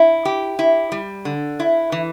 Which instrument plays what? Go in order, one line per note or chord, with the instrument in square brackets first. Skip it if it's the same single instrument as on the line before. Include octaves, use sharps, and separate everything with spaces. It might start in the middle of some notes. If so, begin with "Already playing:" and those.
Already playing: [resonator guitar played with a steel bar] E4
G4
E4
G3
D3
E4
E3